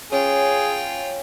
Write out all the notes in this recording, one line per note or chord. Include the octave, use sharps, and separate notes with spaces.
C#4 F4 G#4 G5